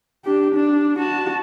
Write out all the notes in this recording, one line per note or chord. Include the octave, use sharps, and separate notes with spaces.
D4 G4
D4
F#4 A5